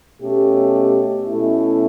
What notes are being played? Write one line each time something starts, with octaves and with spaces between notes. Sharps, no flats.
B2 A3 C#4 G4
B2 A3 C#4 E4